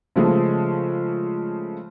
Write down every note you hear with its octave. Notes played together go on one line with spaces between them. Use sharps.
C#3 F3 G#3 A3